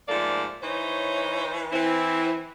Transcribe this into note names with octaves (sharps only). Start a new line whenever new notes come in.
G#2 F3 A3 A#3 A4 D5
E3 D#4 C5 C#5
E3 C4 E4